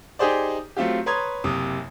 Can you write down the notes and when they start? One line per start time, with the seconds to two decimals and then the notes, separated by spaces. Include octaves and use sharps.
0.19 D#4 G4 G#4 C5 D5
0.77 F#3 A3 C4 F4 G4
1.06 B4 C#5 A#5 C6 D#6 G#6
1.44 F#1 C3 D#6